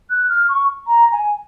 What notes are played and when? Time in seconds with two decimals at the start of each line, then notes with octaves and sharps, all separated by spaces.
0.10 F#6
0.29 F6
0.49 C#6
0.87 A#5
1.12 G#5